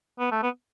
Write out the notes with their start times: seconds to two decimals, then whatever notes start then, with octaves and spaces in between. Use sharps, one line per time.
0.19 B3
0.31 A3
0.43 B3